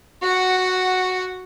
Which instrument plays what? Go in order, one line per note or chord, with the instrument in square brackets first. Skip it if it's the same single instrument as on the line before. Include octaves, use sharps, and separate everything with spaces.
[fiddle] F#4 F#5